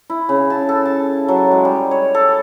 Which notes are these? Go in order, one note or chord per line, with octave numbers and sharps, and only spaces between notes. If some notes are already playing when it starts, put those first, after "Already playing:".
E4
C#3
A5
A4
A5
F#3
G#3
G3
C#5
A4